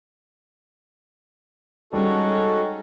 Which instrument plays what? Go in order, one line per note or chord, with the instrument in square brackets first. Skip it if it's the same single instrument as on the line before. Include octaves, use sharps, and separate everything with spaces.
[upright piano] G3 [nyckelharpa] G#3 C#4 [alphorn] D#4 [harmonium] F#4 A4